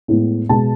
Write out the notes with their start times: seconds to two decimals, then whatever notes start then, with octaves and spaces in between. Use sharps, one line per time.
0.08 A2 G#3 B3
0.49 B2 G#3 B3 A5